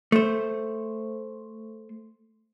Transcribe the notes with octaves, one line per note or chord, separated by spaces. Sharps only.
A3 C5